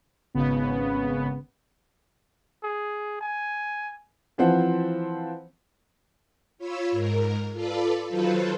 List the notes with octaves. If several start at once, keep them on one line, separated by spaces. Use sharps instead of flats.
G#1 C#3 B3
G#4
G#5
E3 F3 C4 C5 F#5
F4 C#5 B5 E6
G#2 A#4
F4 A4 B4 D5
D#3 F#3 F4 A4 B4 C5